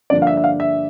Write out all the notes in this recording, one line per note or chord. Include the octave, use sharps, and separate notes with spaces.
G2 D3 F3 A#3 D4 D5
F5
E5
E5
F5
E5